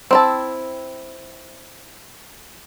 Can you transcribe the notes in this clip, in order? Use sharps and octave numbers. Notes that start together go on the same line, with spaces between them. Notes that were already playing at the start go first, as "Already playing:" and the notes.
C4 E4 A5